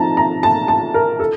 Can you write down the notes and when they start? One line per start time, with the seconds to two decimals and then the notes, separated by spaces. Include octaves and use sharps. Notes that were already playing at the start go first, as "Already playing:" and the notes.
Already playing: F3 C4 D#4 A5 A#5
0.17 A#5
0.43 A5
0.68 A5
0.94 A#4
1.20 A4